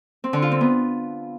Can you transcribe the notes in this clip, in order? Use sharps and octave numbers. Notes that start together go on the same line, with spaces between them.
C4
D3
F4
C4
B3